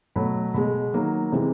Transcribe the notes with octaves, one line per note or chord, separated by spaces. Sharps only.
B2 F#3 A3 B5
B2 G#3 B5
D#3 F#3 A#3
C3 E3 G#3